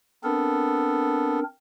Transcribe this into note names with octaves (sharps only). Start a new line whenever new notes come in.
B3 C4 D4 A4 A#4